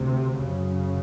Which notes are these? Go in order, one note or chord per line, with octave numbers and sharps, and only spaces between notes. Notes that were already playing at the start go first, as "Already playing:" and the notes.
Already playing: D2 C3
F#2 C#3